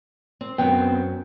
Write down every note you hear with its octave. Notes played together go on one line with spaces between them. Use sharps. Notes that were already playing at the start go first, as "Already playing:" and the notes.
C4
F#2 B3 C4 G5